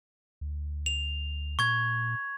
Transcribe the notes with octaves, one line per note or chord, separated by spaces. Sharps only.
D2
F7
A#2 C#6 G#6